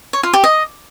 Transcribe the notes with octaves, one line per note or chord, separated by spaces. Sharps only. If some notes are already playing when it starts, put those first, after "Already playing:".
C#5
F4
G4
D#5